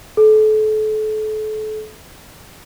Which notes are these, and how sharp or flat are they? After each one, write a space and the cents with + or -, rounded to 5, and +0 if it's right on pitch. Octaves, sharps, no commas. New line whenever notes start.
A4 -35